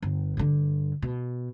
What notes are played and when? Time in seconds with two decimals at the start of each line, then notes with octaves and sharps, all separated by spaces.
0.02 G1
0.37 G2 D3
1.02 B2